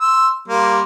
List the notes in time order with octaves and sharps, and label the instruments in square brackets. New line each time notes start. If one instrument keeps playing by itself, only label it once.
[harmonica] C6 E6
G3 A#3 C6